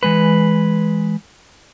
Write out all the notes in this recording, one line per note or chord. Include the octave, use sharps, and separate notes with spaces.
E3 G#3 B4